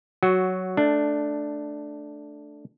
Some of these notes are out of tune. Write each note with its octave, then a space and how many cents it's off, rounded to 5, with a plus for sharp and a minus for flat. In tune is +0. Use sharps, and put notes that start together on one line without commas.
F#3 +5 F#4 +0
A3 -10 D4 +5